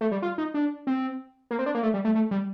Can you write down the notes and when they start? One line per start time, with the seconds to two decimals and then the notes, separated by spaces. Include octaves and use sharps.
0.01 A3
0.11 G3
0.22 F4
0.38 D#4
0.54 D4
0.87 C4
1.51 A#3
1.59 C4
1.66 D4
1.75 A#3
1.83 A3
1.94 G3
2.05 A3
2.15 A3
2.31 G3